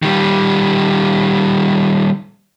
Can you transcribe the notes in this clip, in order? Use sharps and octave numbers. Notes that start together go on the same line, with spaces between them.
D#3 G3